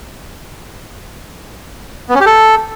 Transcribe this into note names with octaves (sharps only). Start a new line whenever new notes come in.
B3
C#4
G4
A4